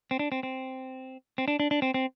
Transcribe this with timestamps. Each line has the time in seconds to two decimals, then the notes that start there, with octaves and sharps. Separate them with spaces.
0.11 C4
0.19 D4
0.32 C4
0.43 C4
1.38 C4
1.48 D4
1.60 D4
1.71 D4
1.82 C4
1.94 C4